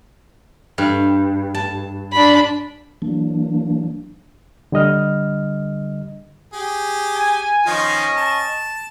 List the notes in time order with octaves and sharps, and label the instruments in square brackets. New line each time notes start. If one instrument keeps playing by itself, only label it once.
[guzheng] G2
A5
[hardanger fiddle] D4 B5
[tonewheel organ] E3 F#3 A#3 D4
[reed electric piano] D3 G3 D#5 F6
[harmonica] G4 G#4
[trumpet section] G#5
[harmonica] D#3 F3 F4 [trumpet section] C#4 D#5 C#6
[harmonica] A5